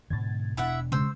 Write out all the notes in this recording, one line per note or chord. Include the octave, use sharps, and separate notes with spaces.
G#2 B2 D3 G#6 A6
E1 B2 D4 E4 E5 F#5
C#3 G#3 C5 E6